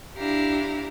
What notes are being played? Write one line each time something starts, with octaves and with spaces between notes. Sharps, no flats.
D4 E4 G4 F5 A#5